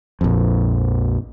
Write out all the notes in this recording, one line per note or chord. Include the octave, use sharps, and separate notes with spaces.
A#1 F2